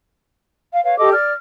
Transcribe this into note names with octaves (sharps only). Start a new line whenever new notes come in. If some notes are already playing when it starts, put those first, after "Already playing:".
F5
B4 C#5 F5
G4 A4 D#5 D6
D5 F6